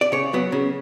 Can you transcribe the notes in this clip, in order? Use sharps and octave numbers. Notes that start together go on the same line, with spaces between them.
D5
C#3 C#5
F#3 B3
C#3